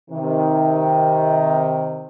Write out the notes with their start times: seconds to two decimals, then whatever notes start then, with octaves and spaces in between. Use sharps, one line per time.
0.11 C3 D#3